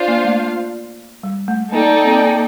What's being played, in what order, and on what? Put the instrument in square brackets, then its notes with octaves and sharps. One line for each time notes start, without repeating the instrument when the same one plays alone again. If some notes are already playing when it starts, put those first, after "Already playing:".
Already playing: [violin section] D4 F4 C5 F5
[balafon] A#3
A3
G3
A3
[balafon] A#3 [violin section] D#4 A4 D5 G5
[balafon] A#3
C4
A#3